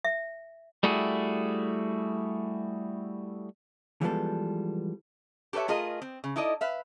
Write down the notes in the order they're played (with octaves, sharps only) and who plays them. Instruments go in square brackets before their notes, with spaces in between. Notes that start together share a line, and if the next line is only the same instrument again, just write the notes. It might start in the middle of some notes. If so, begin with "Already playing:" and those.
[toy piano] E5
[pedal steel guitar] G3 A3 E4 F#4 G#4
[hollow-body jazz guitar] E3 F3 G3 G#3 B3 A4
[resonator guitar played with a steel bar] G4 A4 B4 C#5 E5
A3 F4 G#4 A#4 D#5
C4
C#3
D#4 E4 A4 D5 D#5
B4 E5 F5